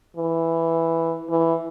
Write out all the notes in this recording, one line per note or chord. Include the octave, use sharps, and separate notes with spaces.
E3
E3